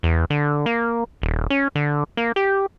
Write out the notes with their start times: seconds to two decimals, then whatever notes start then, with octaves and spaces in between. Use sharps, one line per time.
0.03 E2
0.30 D3
0.66 A#3
1.22 D#1
1.50 C#4
1.75 D3
2.17 A#3
2.36 G4